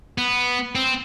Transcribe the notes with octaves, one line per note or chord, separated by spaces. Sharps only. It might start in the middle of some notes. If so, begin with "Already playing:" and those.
B3
C4